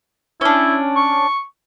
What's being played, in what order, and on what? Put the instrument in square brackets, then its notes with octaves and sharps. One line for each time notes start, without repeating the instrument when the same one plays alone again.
[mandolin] C#4 D4 [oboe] E4
[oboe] C#6